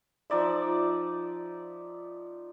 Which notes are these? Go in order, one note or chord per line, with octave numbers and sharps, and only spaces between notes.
F3 D#4 D5 E5